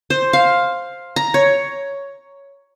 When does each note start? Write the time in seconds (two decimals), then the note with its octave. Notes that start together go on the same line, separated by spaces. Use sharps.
0.10 C5
0.33 F5
1.16 A#5
1.34 C#5